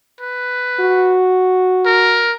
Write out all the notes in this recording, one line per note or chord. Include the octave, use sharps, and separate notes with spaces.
B4
F#4
A#4